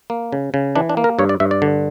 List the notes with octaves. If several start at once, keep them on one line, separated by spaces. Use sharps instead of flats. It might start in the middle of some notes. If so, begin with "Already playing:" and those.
A#3
C#3
C#3
E3 D4
D4
A#3
A#4
G2 C#5
D5
G2 E5
D5
D3